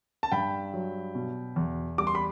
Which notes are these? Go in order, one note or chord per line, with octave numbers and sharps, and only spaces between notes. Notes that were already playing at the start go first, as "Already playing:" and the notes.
A5
G2 G5 B5
F#3
B2
E2
G3 D6
C6
B5